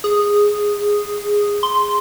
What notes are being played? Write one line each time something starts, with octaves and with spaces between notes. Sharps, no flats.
G#4
C6